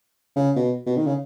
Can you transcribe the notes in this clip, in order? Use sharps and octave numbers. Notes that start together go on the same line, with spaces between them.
C#3
B2
B2
D#3
C#3